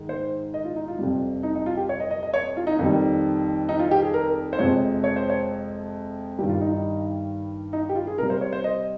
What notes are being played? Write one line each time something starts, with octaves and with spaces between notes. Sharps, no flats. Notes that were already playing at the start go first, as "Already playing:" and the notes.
Already playing: G#2 D#3 G#3
C5
D#5
F4
D#4
F4
F2 C3 G3
D#4
D#4
F4
G4
C#5
D#5
D#5
D#5
C#5
F4
D#4
F2 D#3 G3
D#4
F4
G4
G#4
A#4
C5
F2 C3 F3 G#3 C#5
C#5
C5
C#5
G2 D#3 G3 G4
F4
D#4
D#4
D#4
G4
F4
G#4
C3 G3 A#4
C5
C#5
C5
D#5